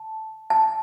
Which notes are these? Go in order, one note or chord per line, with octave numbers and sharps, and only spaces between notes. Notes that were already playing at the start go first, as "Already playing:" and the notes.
Already playing: A5
A5